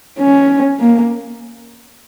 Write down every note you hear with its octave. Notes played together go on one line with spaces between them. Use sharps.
C#4
A#3